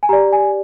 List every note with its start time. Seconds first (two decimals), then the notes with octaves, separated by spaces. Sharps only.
0.03 G#5
0.09 G4 D5 A#5
0.32 G#5